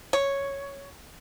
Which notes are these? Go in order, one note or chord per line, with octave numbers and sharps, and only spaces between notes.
C#5